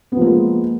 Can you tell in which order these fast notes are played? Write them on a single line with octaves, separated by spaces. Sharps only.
B3 F3 A#3 G#3